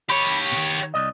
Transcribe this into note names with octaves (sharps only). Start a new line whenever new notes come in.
G4 C#5 B5
B2 D#3
C2 D5 D#5